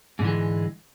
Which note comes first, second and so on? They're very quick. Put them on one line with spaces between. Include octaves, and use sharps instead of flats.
G#2 D3 E3 G#3